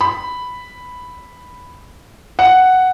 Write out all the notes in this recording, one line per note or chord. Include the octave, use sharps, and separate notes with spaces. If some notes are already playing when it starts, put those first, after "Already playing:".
B5
F#5